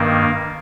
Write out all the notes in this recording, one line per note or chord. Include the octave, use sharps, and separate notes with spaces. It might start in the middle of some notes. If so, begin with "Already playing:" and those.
Already playing: G2 D#3 A#3